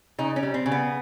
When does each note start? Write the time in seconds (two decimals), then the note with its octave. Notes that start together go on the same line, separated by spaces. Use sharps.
0.18 C#3 D#4
0.36 C#4
0.43 G3
0.54 C4
0.66 C#3
0.72 B3